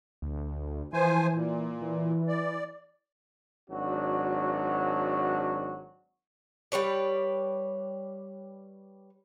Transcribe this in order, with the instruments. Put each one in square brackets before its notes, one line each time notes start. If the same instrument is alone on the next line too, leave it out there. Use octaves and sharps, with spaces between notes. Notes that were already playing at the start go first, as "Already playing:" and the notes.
[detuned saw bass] D2
[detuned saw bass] E3 [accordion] F3 C5 G#5
[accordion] A#2
[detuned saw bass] E3
[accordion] D5
[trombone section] G#1 F#3 D4 F#4
[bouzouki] G3 B4 C#5 D5